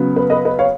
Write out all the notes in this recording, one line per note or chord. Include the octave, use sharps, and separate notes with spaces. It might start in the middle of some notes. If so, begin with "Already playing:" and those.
Already playing: C#3 F#3 B3
B4
B4 D#5
B4 D#5
C#5 F5